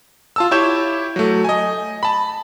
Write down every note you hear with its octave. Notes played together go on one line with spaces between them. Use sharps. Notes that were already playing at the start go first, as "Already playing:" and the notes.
F4 A5 E6
E4 G4 C#5 C#6 G6 E7
F#3 A3
D#5 G#5
A5 B5